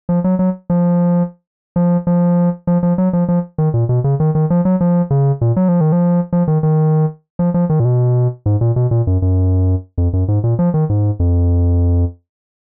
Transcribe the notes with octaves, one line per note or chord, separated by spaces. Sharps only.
F3
F#3
F#3
F3
F3
F3
F3
F3
F#3
F3
F3
D#3
A#2
B2
C#3
D#3
D#3
F3
F#3
F3
C#3
A#2
F#3
F3
D#3
F3
F3
D#3
D#3
F3
F3
D#3
A#2
B2
G#2
A#2
B2
A#2
F#2
F#2
F2
F#2
G#2
A#2
F3
D#3
G#2
F2